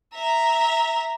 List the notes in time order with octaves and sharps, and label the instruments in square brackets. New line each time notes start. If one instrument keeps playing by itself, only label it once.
[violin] E5 A#5